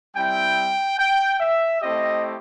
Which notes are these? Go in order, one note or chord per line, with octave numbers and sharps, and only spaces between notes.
G3 C4 E4 G5
G5
E5
A3 C4 E4 G4 D#5